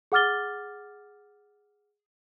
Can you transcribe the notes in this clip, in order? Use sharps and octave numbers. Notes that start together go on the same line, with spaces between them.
G#4 F#5 D6 F6 A6 G7